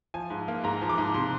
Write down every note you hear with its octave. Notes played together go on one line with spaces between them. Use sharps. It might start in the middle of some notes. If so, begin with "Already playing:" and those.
F3 G#5
G#2
A#3
G#2 A#5
F3
D6
G#2
C3 C6